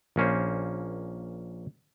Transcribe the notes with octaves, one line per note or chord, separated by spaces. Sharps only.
A#1 A#3 C#4 C5